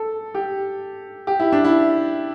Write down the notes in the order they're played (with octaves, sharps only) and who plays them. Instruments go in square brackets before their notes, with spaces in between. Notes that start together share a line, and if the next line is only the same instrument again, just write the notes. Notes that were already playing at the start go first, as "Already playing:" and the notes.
Already playing: [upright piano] A4
G4
G4
E4
D4
E4